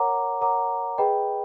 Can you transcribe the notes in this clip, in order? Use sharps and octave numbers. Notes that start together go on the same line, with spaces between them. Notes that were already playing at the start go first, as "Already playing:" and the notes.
Already playing: A#4 C#5 F#5 A#5 D6
A#4 C#5 F#5 A#5 D6
G#4 B4 D#5 G5 B5